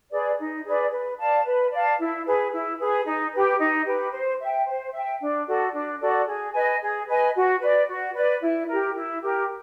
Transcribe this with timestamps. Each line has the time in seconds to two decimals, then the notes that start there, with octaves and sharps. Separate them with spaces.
0.11 G#4 B4 D5
0.38 D#4
0.65 G#4 B4 D5
0.91 B4
1.19 D5 F5 A5
1.44 B4
1.71 D5 F5 A5
1.99 E4
2.26 G#4 B4
2.51 E4
2.78 G#4 B4
3.05 D#4
3.33 G4 B4
3.59 D#4
3.86 G4 B4
4.12 C5
4.40 E5 G5
4.67 C5
4.92 E5 G5
5.20 D4
5.46 F#4 A4 D5
5.73 D4
6.00 F#4 A4 D5
6.27 G#4
6.53 B4 D#5 G#5
6.81 G#4
7.07 B4 D#5 G#5
7.35 F#4
7.60 B4 D5
7.88 F#4
8.14 B4 D5
8.41 E4
8.68 G4 A#4
8.95 E4
9.22 G4 A#4